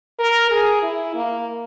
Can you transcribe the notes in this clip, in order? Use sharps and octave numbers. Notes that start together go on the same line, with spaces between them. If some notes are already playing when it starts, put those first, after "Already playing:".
A#4
G#4
E4
A#3